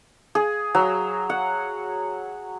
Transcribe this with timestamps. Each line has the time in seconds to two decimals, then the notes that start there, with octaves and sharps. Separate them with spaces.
0.35 G#4
0.75 F#3
1.30 F#5